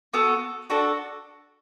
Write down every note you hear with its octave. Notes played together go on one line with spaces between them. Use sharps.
B3 F#4 A4
D4 F#4 A4